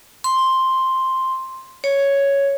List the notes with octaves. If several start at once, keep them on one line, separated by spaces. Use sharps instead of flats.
C6
C#5